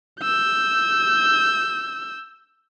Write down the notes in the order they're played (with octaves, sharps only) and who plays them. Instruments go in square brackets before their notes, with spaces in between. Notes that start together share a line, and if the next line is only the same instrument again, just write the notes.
[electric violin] E6 G6